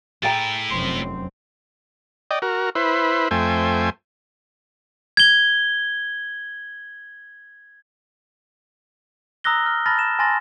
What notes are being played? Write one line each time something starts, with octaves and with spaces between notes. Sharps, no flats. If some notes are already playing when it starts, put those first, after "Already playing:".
A2 E4 G#4 G5 A#5 A6
F1 F#2 C4 C6 C7
D5 D#5 G5
F#4 A#4
E4 B4 C5
F2 A3 C5 G5 G#5
G#6 G7
A#5 D#6 E6 F#6 A#6 G7
F6
A5 B5 F6 A6 A#6
E7
G#5 A5 B5 C6 A6 A#6